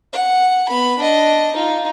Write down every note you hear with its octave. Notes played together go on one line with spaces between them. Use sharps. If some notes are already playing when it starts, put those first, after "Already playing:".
F#5
B3 B5
D4 D#5
D#4 F4